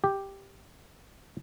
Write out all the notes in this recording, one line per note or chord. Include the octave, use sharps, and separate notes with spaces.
G4